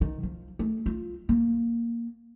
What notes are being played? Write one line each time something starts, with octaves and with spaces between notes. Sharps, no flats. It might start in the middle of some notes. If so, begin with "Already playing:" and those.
D#3
F3
A3
F4
A#3